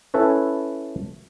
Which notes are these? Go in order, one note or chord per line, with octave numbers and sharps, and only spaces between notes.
C#4 E4 A4 B4 C#5